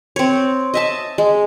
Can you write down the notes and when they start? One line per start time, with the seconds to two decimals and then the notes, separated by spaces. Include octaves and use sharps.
0.16 C4 C#5
0.74 D#5 E5 A5
1.18 G#3